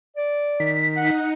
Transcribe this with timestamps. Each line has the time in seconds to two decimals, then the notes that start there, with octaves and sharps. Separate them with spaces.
0.16 D5
0.60 D#3 B6
0.97 D#4 F#5